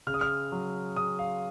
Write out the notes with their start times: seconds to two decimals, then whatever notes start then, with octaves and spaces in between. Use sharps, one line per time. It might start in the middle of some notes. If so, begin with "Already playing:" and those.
0.07 C#3 F6
0.14 D#6
0.21 F6
0.52 F#3
0.96 C#3 D#6
1.19 F5